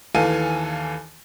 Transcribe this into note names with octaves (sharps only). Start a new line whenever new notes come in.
D#2 E3 A4 F5 G#5 D#7